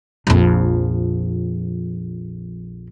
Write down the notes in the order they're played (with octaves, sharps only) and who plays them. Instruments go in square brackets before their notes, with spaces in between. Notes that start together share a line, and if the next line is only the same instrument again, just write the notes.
[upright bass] A#1 F2